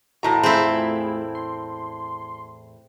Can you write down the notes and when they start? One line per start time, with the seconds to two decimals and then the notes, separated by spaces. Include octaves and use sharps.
0.23 E2 A2 F#4 A#5
0.43 A3 C4 E4 F4 G#4
1.35 C6